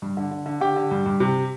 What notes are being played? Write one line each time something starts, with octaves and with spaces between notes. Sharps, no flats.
G2
D3
D3
D3
D3 G4 G5
D3
G2
G2
C3